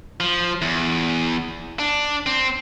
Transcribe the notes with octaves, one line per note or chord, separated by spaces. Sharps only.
F3
E2
D4
C4